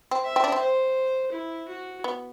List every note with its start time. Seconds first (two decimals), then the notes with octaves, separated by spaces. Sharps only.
0.11 C4
0.24 E5
0.36 C4
0.44 D4
0.52 C4
0.60 C5
1.32 E4
1.68 F#4
2.04 B3